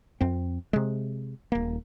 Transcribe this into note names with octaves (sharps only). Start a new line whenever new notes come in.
F2 C4
C3 G#3
D#1 A#3